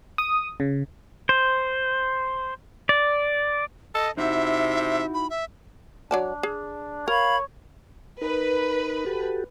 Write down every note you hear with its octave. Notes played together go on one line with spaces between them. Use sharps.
D#6
C#3
C5
D5
A4 D#5
C3 D#4 E4 F#4 E5
B5
E5
F#3 D4 D5 A5
G#4
A#4 C#5 F5 B5 G#6
D#4 A#4 B4
F#4 G4 A4